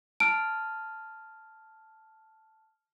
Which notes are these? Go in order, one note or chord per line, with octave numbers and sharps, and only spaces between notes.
A5 F6 D7